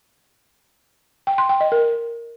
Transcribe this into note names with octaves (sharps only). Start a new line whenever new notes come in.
G5
C6
G5
D#5
A#4